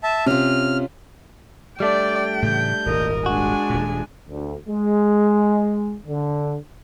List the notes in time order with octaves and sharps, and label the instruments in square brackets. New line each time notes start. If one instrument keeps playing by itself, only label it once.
[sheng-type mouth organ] E5 A5
[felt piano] C3 [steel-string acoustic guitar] C#4 F4 [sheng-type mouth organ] F6
[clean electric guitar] G3 A3 D4 [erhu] D5 [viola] G5
[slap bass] A2 C#3 E3 [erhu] G6
[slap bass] D#1 G#1 [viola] A#4 D#5
[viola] G#3 D4 [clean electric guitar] F#4 [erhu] G#5
[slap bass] D#1 A#2
[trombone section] D2
G#3
D3